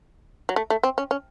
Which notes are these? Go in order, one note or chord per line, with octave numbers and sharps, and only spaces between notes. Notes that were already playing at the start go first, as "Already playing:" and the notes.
F#3
A3
A3
C4
C#4
C#4